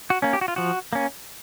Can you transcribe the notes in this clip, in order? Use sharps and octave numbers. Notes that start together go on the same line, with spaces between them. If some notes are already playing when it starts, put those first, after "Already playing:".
F#4
A#3 C#4
G4
F#4
F4
F3 F#4
A#3 C#4